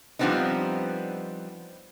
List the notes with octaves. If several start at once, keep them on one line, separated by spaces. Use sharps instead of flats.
F3 G3 B3 C4 D4 D#4